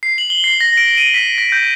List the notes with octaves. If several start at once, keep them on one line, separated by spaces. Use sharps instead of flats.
C7
F#7
G7
C7
A#6
D7
D#7
B6
A#6
G6